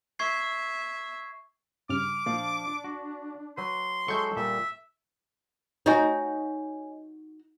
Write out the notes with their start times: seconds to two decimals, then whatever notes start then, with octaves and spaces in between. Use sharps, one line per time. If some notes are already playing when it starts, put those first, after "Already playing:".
0.19 E5 C#6 G#6 C7
1.89 G2 C#3 D6 F6
2.26 A#2 F3 D4 D5 F5
2.84 F#4
3.57 F#3 B4 C6
4.08 F#3 G#3 E4 A4 C#6 G6
4.36 A#2 G3 E5
5.86 D#4 F#4 C#5 D#5 G#5